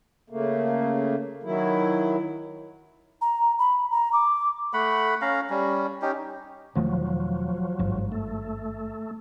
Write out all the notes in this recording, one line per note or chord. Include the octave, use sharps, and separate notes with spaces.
C#3 A3 A#3
D#3 F#3 E4
A#5
B5
A#5
D6
A3 F#5 B5
C#4 F5 A#5
G3 C#4
C#4 D#4 G4
E1 D#3 F3 F#3 A3
G#1 G2
A3